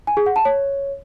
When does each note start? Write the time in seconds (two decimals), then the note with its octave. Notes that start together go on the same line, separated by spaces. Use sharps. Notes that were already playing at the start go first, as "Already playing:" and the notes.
0.07 G#5
0.17 G#4
0.26 F#5
0.36 A5
0.45 C#5